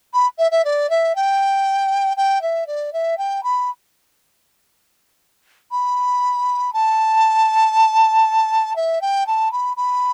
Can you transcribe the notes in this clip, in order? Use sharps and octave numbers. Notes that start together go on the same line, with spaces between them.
B5
E5
E5
D5
E5
G5
G5
E5
D5
E5
G5
B5
B5
A5
E5
G5
A5
B5
B5